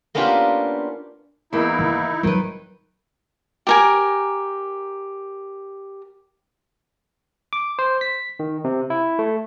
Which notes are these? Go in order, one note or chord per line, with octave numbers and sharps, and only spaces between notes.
A#3 B3 C#4 D4 F4 G4
E2 A#3 D#4 E4
D#3
D#3 F3 F#3 B4
G4 A#4 G#5
D6
C5
B6
D#3
C3
E4
A3